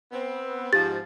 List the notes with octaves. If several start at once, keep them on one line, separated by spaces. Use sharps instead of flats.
B3 C4
G#2 F3 G4 A6